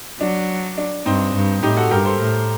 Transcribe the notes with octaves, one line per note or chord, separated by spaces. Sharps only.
F#3 D4
D4
G2 C4 D#4
G2
A2 D#4 G4
F#4 A4
G2 G4 A#4
A4 C5
A2